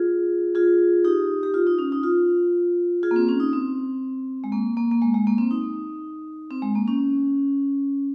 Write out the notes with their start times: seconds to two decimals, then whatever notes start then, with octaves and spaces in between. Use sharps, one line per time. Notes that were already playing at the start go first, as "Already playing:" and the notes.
Already playing: F4 G#4
0.55 F4 G#4
1.04 D#4 G4
1.43 G4
1.54 F4
1.67 D#4
1.79 C#4
1.92 D#4
2.03 F4
3.03 F4 G#4
3.11 A#3
3.16 C4
3.29 C#4
3.40 D#4
3.53 C4
4.44 G#3
4.52 A#3
4.77 A#3
4.91 A#3
5.02 G#3
5.14 G#3
5.27 A#3
5.38 C4
5.51 D#4
6.51 C4
6.62 G#3
6.75 A#3
6.88 C#4